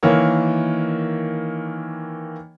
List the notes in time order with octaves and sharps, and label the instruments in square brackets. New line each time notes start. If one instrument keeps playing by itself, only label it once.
[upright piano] D#3 E3 A#3 C#5